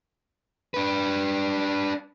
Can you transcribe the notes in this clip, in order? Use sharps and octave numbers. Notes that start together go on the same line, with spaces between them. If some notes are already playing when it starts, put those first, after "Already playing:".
D4 B4